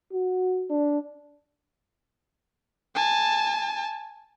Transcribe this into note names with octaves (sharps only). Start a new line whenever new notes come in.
F#4
D4
G#5 A5